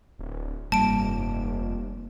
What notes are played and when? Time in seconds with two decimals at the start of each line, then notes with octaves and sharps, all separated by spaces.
0.19 D1
0.72 F1 G2 G3 A#3 A5 D7